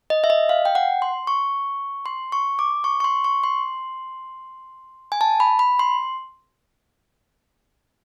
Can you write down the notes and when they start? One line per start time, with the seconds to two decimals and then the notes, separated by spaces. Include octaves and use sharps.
0.10 D#5
0.24 E5
0.30 D#5
0.49 F5
0.65 G5
0.75 F#5
1.02 C6
1.27 C#6
2.06 C6
2.32 C#6
2.59 D6
2.84 C#6
3.00 C#6
3.04 C6
3.24 C#6
3.44 C6
5.12 G#5
5.21 A5
5.40 B5
5.59 B5
5.79 C6